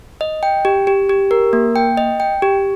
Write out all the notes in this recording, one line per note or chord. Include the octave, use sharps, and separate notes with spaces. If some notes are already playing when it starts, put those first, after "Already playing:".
D#5
G5
G4
G4
G4
A#4
A#3
G5
D#5
G5
G4